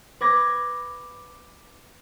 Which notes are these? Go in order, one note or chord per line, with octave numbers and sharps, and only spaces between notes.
B4 D6 G#6 A#6